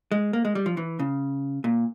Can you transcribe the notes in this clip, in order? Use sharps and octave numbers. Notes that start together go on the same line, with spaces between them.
G#3
A#3
G#3
G3
F3
E3
C#3
A#2